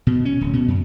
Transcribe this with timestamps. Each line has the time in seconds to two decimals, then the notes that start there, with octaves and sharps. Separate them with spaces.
0.07 B2
0.25 C#4
0.41 D1
0.53 B2
0.68 F#2